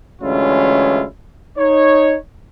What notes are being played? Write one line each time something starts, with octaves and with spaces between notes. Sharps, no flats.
D2 E3 G#3 C#4 E4 F4
D#4 C#5